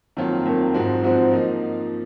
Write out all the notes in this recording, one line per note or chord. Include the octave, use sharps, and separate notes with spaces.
F2 D#3 F#3 A#3 F4
F2 D#3 F#3 A#3 F4
G#2 F3 C4 F#4 C5
G#2 F3 C4 F#4 C5
F3 A#3 D#4